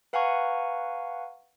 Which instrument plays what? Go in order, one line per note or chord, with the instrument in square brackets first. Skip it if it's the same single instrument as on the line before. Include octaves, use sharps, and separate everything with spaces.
[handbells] B4 F5 F#5 G#5 A#5 C#6